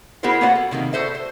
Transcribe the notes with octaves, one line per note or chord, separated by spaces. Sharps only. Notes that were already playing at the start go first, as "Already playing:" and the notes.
B3 E4 F#4 G#4 A#4 C5
A#3 B3 F4 F#4 C#5 F#5
A4
C3 D#3 G#3 A#3
F#4 G4 A4 C5 E5
C5